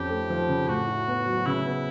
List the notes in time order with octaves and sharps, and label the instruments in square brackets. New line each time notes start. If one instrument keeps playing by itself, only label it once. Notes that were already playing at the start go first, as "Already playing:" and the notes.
Already playing: [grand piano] F2 C#4 [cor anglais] G4
[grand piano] A3
F3
C#3
[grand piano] A2 [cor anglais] F#4
[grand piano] E4
B3
F#3
[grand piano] C#3 [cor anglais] E4
[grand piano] B3